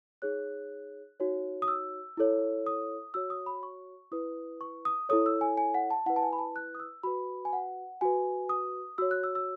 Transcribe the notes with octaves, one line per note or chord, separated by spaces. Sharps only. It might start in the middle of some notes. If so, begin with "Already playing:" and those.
D#4 G#4 C#5 F#6
D#4 F#4 C#5
D#6
E6
E4 A4 C#5
D#6
F#4 C#5 E6
D#6
B5
C#6
E4 B4 D#6
C#6
D#6
E4 A4 C#5 D#6
E6
G#5
G#5
F#5
A5
E4 B4 F#5
A5
G#5
B5
A5
F#6
D#6
E6
F#4 B4 B5
G#5
F#5
F#4 B4 G#5
D#6
F#4 C#5 E6
F#6
E6
E6